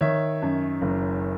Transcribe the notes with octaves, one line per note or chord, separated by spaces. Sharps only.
D#3 C#5 E5
F#2
F#1